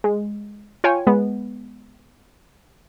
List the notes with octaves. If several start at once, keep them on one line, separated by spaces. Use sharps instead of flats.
G#3
F4 C#5 G5 G#5
G#3 B3